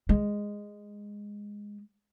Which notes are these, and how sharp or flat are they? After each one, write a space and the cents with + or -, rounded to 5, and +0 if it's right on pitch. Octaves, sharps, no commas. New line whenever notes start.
G#3 -10